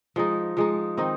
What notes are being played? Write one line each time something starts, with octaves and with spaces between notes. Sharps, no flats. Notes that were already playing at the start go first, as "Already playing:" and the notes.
F3 G#3 D#4
F3 G#3 D#4
D#3 C4 D#4